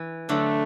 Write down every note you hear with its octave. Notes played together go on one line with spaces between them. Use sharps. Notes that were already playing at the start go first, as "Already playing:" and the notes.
Already playing: E3
D3 F#3 A3